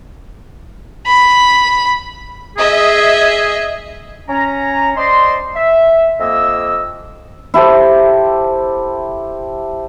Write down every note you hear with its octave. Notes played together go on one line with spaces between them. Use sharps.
B5
G#4 D#5 E5
C#4 A#5
C5 D5 D#5 C6
E5
F2 A#3 D#5 E6
E4 G4 A4 C5